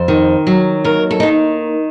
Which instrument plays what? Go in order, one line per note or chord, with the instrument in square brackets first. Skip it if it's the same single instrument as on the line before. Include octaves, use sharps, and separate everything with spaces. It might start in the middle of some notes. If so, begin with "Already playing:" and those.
Already playing: [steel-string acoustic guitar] F2 C5
D#3
F#3
D#2 A#4
A4
D#4
D#3